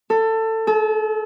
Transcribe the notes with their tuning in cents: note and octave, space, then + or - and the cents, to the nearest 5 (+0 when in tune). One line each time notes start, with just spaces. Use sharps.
A4 +20
A4 -40